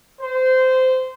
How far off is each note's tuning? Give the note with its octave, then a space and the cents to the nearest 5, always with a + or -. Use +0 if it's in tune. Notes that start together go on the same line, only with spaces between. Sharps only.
C5 -20